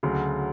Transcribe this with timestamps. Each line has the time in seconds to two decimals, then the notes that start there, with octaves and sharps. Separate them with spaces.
0.03 D2 C#3 F#3